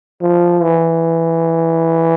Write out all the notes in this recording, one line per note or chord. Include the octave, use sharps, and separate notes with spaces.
F3
E3